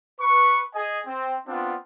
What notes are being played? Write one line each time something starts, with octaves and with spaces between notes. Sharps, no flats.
B4 C#6
G#4 D#5 G#5
C4
B3 C4 D4 F4